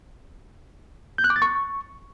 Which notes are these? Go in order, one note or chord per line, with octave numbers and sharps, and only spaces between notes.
G6
F#6
D6
A6
C#6